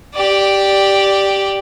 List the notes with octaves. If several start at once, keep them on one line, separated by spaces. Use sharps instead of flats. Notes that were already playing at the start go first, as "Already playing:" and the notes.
G4 D5